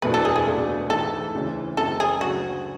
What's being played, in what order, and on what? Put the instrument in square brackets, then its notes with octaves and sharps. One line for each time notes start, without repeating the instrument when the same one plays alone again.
[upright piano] F#1 E2 B2 A3 D4 [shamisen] B4
[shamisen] A4
G#4
G#4
[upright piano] C#2 B2 A3 D4
[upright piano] G#2 E3 A3 E4 [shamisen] A4
[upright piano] D2 C#3 E3 G#3 C#4
[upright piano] F#1 F#2 C#3 [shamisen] A4
[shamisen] G#4
[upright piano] D2 C#3 F#3 C#4 [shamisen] F#4